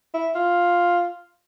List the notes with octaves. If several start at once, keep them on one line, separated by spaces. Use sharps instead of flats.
E4
F4